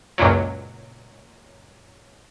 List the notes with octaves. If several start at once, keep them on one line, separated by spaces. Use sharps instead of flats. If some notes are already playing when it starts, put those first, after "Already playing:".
C#2 F#2 A#2 F#3